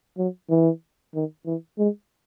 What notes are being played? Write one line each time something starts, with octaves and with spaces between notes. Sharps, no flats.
F#3
E3
D#3
E3
G#3